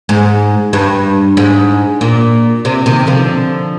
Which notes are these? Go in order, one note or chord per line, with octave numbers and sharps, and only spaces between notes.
G#2
G2
G#2
A#2
C3
C3 D#3
D3 F3